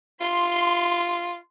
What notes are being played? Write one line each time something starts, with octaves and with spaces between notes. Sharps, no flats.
F4 C6